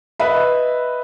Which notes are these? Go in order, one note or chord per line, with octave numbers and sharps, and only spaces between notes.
B4 D#5 E5 B5